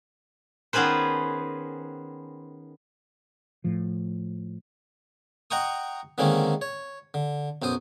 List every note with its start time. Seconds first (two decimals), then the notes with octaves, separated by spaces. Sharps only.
0.73 D#3 B3 C#4 G#4 B4 C5
3.64 A2 F3
5.51 D#5 F#5 G5 A#5 C#6 D#6
6.18 D3 D#3 G#3 A#3 C4 C#4
6.62 C#5
7.14 D3
7.62 B1 F#2 C5 D#6